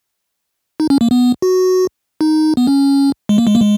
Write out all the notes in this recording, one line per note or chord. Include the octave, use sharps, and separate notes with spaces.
D#4
C#4
A#3
B3
F#4
D#4
B3
C#4
G#3
A#3
G#3
A#3
G#3